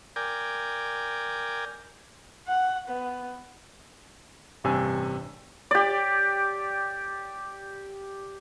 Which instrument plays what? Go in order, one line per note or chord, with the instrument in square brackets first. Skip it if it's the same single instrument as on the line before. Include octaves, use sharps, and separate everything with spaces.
[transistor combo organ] A#4 D5 G5 G#5
[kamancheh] F#5
B3
[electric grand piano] A1 G2 C3 G#5 E6
[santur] G4 D5